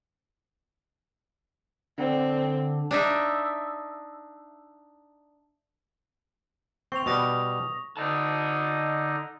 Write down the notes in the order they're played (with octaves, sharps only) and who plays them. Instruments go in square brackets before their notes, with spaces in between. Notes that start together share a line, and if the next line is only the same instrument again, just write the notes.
[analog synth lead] D3 [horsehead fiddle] C4
[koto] D4 D#4 E5
[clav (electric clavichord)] C4 [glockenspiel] C#6 F7
[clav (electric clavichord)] B2 G3 [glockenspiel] C#6 D#6 A#6
[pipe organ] D3 D#4 [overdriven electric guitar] D#5 A5